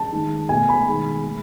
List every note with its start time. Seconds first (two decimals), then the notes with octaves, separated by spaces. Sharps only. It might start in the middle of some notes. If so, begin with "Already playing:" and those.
Already playing: A5
0.12 D#3 G#3
0.49 B2 A3 G#5
0.69 B5
0.87 D#3 G#3
1.25 G#3